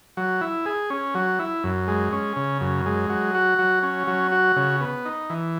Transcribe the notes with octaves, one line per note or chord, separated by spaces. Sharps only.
F#3
E4
G#4
C#4
F#3
E4
F#2
G#3
C#4
C#3
F#2
G#3
F#3
F#4
F#3
C#4
F#3
F#4
C#3
B3
D#4
E3